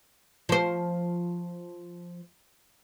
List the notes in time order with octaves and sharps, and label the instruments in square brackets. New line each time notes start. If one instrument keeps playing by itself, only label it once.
[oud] F3 C5